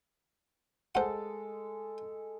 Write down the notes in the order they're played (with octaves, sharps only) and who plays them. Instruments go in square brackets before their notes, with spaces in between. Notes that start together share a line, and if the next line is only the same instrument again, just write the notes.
[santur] G#3 A4 [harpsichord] C5 F#5